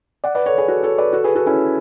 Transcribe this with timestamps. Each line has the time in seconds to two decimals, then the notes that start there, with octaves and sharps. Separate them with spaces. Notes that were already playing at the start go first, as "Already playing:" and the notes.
0.24 D5 F#5
0.35 B4 D5
0.46 A4 C#5
0.58 G#4 B4
0.68 F#4 A4
0.83 A4 C#5
0.98 B4 D5
1.13 F#4 A4
1.24 G#4 B4
1.35 F#4 A4
1.46 C#4 E4